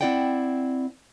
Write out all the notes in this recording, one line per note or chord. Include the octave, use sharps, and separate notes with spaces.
C4 C#4 E4 D5 F#5 G5